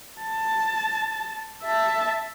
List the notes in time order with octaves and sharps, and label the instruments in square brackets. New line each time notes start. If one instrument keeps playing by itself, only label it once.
[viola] A5
E5 A5